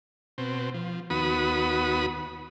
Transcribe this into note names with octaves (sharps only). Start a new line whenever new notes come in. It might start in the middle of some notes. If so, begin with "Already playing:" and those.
B2 C4
F3
D#2 B3 F#4 B5 D#6